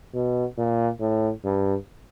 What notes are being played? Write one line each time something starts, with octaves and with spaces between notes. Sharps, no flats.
B2
A#2
A2
G2